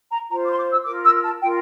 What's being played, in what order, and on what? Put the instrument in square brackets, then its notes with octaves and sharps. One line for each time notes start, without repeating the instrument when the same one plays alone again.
[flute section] A#5
F4 C5 A#5
D6
C6
D6
E6
F4 A#4 D6
E6
A5
F4 A#4 G5